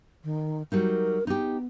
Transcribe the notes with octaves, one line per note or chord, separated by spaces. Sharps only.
D#3
F#3 G3 D#4 A#4
B3 D#4 G4